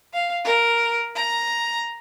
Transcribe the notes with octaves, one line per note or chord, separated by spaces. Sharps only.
F5
A#4
A#5